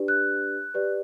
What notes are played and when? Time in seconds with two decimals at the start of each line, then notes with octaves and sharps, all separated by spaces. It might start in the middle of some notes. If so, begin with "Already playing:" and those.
Already playing: D4 G4 B4 D5
0.08 F#6
0.74 G4 B4 D5